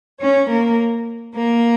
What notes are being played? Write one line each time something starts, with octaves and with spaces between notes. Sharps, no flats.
C#4 C#5
A#3 A#4
A#3 A#4